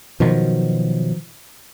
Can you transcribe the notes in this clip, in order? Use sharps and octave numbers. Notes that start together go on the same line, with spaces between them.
B2 D#3 F3 F#3